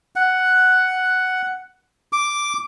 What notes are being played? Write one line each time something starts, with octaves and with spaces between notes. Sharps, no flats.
F#5
D6